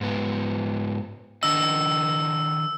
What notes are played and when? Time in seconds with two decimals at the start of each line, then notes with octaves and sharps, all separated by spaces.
0.01 G#2 B3
1.43 D#3 D4 D#5 E6